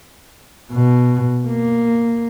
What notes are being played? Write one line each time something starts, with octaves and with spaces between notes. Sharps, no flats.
B2
A#3